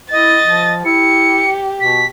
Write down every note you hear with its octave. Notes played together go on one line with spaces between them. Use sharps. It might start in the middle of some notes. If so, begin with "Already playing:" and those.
E4 D#5 A6
F3
E4 G4 C#7
B2 B6